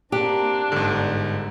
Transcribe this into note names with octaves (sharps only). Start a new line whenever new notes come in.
A#3 C4 D4 G4
G1 G#2 D3